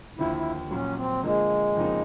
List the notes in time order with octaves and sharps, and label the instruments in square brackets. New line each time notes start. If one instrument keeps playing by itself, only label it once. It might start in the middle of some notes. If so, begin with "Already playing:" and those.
[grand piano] D#2 D3 F3 [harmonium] E4
[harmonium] E4
[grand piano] A#1 A#2 F#3 [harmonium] C#4
[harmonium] C4
[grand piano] D3 F3 A#3 [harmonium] G#3
[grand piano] F2 C#3 F3 A#3 D#4